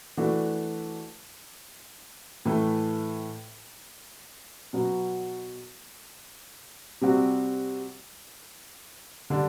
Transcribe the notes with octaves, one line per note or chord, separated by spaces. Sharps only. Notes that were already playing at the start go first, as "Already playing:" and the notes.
E3 A3 D4 F#4 A4
A2 E3 A3
B2 F#3 B3
C3 G3 C4 F#4
D3 G3 D4